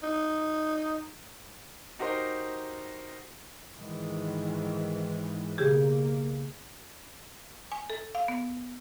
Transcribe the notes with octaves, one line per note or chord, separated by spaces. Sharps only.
D#4
D#4 F#4 G4 A#4 C5
G#2 D#3 E3
B1 C#3 A#3 G4 G#4
G#5
A4
F5
B3